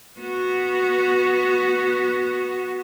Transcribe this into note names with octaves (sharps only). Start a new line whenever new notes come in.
B3 F#4